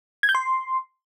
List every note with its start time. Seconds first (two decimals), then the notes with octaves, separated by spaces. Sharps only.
0.23 G#6
0.29 G6
0.35 C6